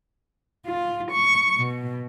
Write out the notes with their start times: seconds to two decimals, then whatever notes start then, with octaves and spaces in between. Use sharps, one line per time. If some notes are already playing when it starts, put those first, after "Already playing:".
0.66 F4
1.12 C#6
1.59 B2